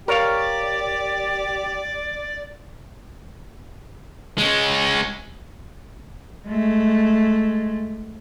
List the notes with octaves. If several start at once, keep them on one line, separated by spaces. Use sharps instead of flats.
G4 A#4 C#5 D5 F5
G#3 C#4
G#3 A3